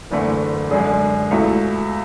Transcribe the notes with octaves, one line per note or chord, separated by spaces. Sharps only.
F#1 E2 D3 A3
F#2 D3 G#3 D4 G#4
C#2 B2 A3 E4